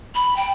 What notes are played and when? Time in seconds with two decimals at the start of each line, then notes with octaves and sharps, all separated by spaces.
0.15 B5
0.37 G5